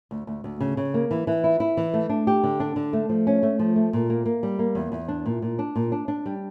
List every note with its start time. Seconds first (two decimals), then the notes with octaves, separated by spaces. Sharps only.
0.11 D2
0.27 D2
0.44 D2
0.60 C#3
0.77 C#3
0.94 A#3
1.11 E3
1.27 E3
1.44 E4
1.60 E4
1.77 E3
1.94 A3
2.09 D4
2.27 G4
2.44 D3
2.60 D4
2.76 D3
2.93 A3
3.09 F3
3.27 C#4
3.43 A3
3.59 F3
3.76 A3
3.93 A#2
4.10 A#3
4.26 A#3
4.43 G3
4.59 A#3
4.75 E2
4.92 E2
5.08 D4
5.26 A#2
5.42 A#2
5.59 D4
5.76 A#2
5.92 D4
6.08 D4
6.26 G3